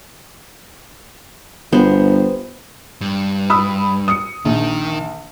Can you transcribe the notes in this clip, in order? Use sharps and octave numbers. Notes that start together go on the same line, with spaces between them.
G1 B3 C5
G2
B5 D#6 E6
D#6 C#7
A#1 D#3